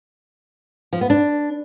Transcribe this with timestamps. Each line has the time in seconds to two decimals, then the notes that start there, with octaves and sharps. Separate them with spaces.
0.93 F3
1.01 B3
1.10 D4